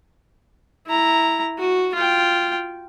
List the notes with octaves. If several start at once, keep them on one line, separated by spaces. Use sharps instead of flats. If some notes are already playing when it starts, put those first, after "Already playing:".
E4 A#5
F#4
F4 G5